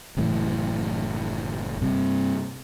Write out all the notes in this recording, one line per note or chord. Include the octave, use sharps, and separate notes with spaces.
F#1 F#2 A2 E3
G2 C3